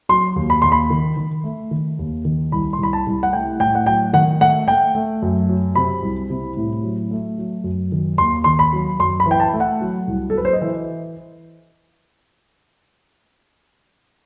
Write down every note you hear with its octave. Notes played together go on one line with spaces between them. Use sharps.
F#3 C6
D#2
B5
D#2 C6
B5
D#3
D#3
A3
D#3
D#2
D#3
C2 B5
C6
C2 B5
A5
C2
F#5
A3 G5
A2 G5
F#5
F#3 G5
D#3 F#5
A3 F#5
A3 G5
A3
F#2
F#3
C3 B5
C2
C3
A2
F#3
A3
F#3
F#2
D#3
D#2 C6
D#3 C6
B5
F#3
F#2 C6
B5
E3
G5
A5
A3
F#5
F#3
C2
A4
F#3 B4
C5
D#5
E3 E5